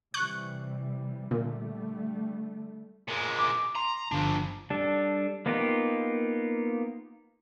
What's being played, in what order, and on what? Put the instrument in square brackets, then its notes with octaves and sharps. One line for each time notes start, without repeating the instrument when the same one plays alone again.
[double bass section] C3 E3 G3 [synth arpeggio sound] C#6 F#6
[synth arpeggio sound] A#2 [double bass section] D3 G3 A3
[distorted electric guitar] A#2 G#3
[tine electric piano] D6
[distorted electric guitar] A#5 [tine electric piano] C6
[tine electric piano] G1 [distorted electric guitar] F3 D4
[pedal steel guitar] G3 D4 A4
A#3 B3 D#4 F4 G4